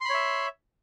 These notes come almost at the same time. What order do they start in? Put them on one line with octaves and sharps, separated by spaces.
C6 B5 C#5 E5